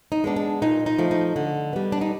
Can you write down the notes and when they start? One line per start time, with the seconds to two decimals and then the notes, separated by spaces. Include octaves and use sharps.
0.12 D#4
0.24 G#3 B3 D4
0.36 D4
0.62 A#2 D#4
0.86 D#4
0.99 F3 A3
1.11 D#4
1.36 D3
1.73 G3 B3
1.92 D4
2.01 D#4